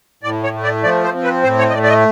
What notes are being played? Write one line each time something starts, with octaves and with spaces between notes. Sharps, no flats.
A2 D5
C#5
A3
D5
F3 D5
C5
C4
B4
A2 C5
C#5
D#5
A3 D5
D5
D#5